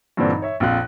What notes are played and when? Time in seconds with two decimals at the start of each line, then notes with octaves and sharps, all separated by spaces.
0.17 G2 A#2 D3 E3 C4 D4
0.31 D#4
0.42 C#5 E5
0.60 A#1 F2 F4 F#6